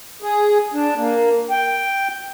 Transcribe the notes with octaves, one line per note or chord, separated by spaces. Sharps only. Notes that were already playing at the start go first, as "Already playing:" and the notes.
G#4
D4
A#3
G5